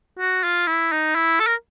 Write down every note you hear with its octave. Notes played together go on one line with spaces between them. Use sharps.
F#4
F4
E4
D#4
E4
A4
A#4